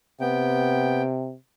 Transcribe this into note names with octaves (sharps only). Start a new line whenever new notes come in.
C3 B3 G5